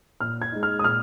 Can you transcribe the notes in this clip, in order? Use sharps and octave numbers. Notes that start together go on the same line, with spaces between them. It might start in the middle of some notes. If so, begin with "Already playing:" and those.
A#2 F6
G#6
G#3 D#4
F6
D#6
A#2 F6